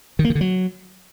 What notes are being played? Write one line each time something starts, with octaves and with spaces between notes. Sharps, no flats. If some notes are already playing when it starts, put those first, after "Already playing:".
D#3
A#3
D#3
D3
F#3